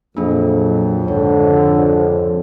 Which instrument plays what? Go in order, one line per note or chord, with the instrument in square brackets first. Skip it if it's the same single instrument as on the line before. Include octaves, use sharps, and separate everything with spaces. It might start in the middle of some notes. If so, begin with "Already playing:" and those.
[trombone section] F2 [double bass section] A#2 F#3 [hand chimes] A#3 D4 G#4
[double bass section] C#2 G#2 [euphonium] D3 [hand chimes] C#5